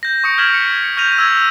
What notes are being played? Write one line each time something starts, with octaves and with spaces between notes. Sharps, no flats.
G6 A#6
C#6 D#6 C#7 D7
F6 G6 G#6 B6 E7 F#7
C#7
C#6 F6 G6 A#6 D#7 F7
E6 G#6